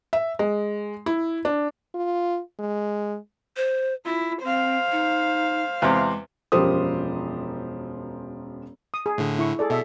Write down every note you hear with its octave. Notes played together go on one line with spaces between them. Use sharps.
E5
G#3
E4
D4
F4
G#3
C5
E4 F4
C4 C5 F5
D#4
E2 C3 G#3
E1 F#2 F3 G4 C5 D#6
D#6
G#4
A2 D3
E4 C#6
G#4 A4 D5
B2 A4 E5